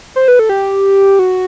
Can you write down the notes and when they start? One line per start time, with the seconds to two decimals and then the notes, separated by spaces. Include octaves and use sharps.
0.16 C5
0.28 B4
0.39 A4
0.49 G4
1.19 F#4